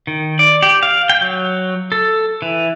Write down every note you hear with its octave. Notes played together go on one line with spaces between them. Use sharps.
D#3
D5
G4
F5
G5
F#3
A4
E3